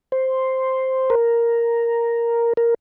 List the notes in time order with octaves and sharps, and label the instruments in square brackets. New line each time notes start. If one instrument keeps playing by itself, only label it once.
[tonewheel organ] C5
A#4
A#4